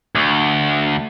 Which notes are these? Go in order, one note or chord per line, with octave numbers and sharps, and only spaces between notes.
D2